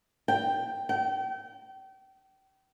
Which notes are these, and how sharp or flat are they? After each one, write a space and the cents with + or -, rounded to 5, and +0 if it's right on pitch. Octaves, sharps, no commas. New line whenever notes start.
G5 +5
G5 -30